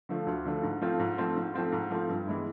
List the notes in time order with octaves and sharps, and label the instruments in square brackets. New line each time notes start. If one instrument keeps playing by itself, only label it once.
[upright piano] D3 F3 A3
D2
D3 F3 A3
G#2
F3 A3 C4 F4
G#2
F3 A3 C4 F4
G#2
F3 A3 C4 F4
G#2
F3 A3 C4 F4
G2
E3 G#3 B3 E4